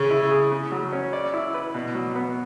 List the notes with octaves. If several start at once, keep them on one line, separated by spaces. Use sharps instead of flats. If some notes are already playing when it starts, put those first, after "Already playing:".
Already playing: C#3 C#4 C#5
E4
G#4
C#3
F#3
C#4
D5
E4
B4
B2
F#3
B3